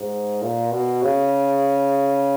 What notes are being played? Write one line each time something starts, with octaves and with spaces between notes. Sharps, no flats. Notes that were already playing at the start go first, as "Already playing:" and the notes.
Already playing: G#2
A#2
B2
C#3